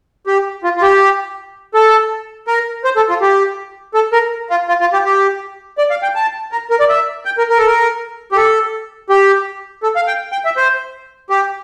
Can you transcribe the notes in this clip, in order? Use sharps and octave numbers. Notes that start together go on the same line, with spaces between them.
G4
F4
F4
G4
A4
A#4
C5
A4
F4
G4
A4
A#4
F4
F4
F4
G4
G4
D5
F5
G5
A5
A#4
A#4
D5
E5
G5
A#4
A#4
A4
A#4
G4
A4
G4
A4
F5
G5
G5
E5
C5
G4